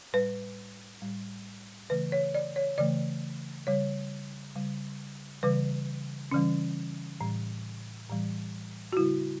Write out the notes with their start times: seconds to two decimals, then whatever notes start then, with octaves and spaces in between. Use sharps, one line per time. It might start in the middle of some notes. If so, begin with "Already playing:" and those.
0.13 A2 G3 B4
1.02 A2 G3
1.90 C#3 E3 A3 B4
2.12 C#5
2.35 D5
2.56 C#5
2.78 C#3 E3 A3 D5
3.67 C#3 G3 C#5
4.56 C#3 G3
5.43 C#3 E3 G3 B4
6.31 C#3 E3 G3 C#4
7.20 A2 E3 G3
8.09 A2 E3 G3
8.93 F#4
8.97 C#3 G3 E4